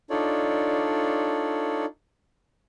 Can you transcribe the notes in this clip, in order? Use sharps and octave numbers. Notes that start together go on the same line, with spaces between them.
D4 D#4 F4 A4 C#5 D5